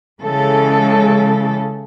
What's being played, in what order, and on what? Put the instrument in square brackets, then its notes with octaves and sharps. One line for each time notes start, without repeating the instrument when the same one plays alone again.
[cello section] C#3 E3 G#3 A4